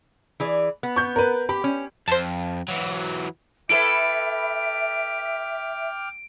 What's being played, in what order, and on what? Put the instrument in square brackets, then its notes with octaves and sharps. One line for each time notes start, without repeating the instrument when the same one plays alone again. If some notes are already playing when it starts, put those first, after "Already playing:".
[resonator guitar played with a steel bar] E3 G#4 D5
B3
[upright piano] C#6 G6
A#4 B4
[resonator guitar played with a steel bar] G4 [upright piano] B5
[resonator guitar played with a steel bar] C#4
[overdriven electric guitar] F2 [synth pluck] C5 A5
[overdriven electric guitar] E3 F#3
[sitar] E4 A4 B4 [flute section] E5 [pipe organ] G5 D6 F6 [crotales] D7